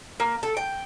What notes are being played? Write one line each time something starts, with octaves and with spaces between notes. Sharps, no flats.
A#3
A4
G5